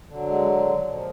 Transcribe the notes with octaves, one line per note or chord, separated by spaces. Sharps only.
D3 F#3
G#3
A#2 F3